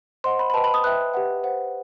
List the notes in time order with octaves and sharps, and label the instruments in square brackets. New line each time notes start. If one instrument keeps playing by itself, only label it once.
[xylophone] C5 D#5 F#5 C6
B5
B5
B4 D#5 G5 A5
B5
D#6
B4 E5 G5 F#6
G4 B4 F#5
C5 F#5